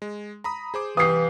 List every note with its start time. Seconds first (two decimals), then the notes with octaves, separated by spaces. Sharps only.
0.02 G#3
0.44 A#5 B5 D#6
0.74 G#4 C5 D6
0.97 C2 E3 G4 F5 D#6 C7